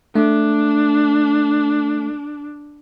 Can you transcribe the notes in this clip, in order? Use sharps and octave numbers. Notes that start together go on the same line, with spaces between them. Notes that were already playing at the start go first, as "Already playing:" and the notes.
A3 D4